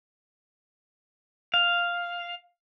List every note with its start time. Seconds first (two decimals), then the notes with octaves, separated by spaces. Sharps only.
1.54 F5